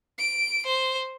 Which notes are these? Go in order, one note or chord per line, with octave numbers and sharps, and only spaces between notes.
D7
C5